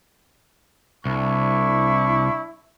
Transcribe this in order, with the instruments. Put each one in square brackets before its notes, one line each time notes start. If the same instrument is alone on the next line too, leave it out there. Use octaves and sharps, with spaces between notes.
[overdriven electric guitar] C2 [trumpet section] D4 E4 C#6